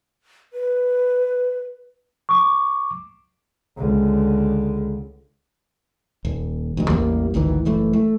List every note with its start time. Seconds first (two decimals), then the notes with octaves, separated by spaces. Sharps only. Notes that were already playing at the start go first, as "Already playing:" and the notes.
0.53 B4
2.29 C#6 D6
3.78 C#2 D3
6.25 D#1
6.77 D2 D#3
6.90 A1 E2 G3 A#3
7.34 G#1 D2 D#3 E3
7.65 F#1 E3 A3
7.93 A3